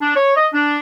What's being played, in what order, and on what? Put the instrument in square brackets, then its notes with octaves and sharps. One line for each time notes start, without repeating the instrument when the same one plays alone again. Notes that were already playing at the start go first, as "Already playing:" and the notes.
[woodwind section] D4
C#5
D#5
D4